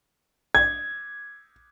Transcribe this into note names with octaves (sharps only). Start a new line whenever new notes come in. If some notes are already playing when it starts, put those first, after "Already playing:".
G#6